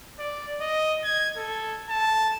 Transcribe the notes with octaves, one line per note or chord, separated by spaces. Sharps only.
D5
D#5
G#6
A4
A5